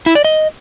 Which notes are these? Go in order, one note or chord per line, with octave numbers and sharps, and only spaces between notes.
E4
D5
D#5